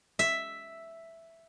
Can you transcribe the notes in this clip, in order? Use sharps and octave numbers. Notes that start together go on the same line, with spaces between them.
E5